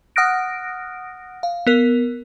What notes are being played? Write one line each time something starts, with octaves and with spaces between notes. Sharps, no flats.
F#5 D#6 F6 F#6 A#6 D7
F5
B3 A#4